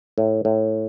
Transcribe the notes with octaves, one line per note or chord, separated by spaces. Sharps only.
A2
A2